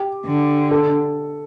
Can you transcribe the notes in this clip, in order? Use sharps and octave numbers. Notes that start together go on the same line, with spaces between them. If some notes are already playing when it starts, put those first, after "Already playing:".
Already playing: G4
D3
A4